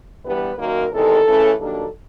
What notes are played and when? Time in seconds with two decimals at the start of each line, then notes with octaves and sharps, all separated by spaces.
0.24 G2 E3 G3 B3 B4
0.58 F#2 D#3 F#3 A#3 A#4
0.92 E2 C3 D#3 G#3 A4
1.25 C#3 E3 A3 C#4
1.58 G2 D#3 F#3 A#3 D4 A4